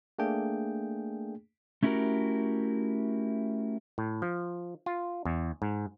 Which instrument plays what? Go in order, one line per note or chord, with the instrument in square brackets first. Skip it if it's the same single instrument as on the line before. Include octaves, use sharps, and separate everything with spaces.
[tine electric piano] A3 A#3 D4 G#4 G5
[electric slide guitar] A3 C#4 E4 F#4 G4 A#4
[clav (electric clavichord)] A2
F3
F4
E2
G#2